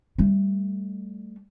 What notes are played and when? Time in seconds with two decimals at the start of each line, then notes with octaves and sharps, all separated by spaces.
0.18 G3 A3